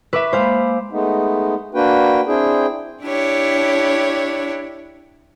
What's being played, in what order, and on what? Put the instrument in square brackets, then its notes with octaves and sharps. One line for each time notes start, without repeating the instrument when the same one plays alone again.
[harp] B4 [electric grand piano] E5 D6 E6 [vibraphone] C#6
[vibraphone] G#3 A#3 [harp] C5 F5 [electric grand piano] B5
[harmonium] G#3 A3 B3 D#4
A#3 D4 F#4 B4 G5
C4 D4 E4 G#4 G5
[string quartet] D4 E4 G4 C#5